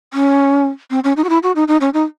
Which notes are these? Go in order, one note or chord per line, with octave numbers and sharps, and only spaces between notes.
C#4
C4
C#4
D#4
F#4
E4
F#4
D#4
D#4
C#4
D#4